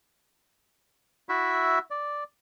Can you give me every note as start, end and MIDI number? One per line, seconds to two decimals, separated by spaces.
1.29 1.79 64
1.29 1.79 66
1.29 1.79 76
1.90 2.24 74